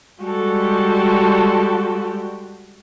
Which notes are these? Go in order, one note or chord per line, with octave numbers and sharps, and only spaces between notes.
G3 G#3 F#4 G4 A4